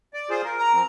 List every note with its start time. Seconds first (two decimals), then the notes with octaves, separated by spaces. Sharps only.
0.14 D5
0.30 F4 G#4 C5
0.44 A#4
0.59 A#5
0.73 F3 C4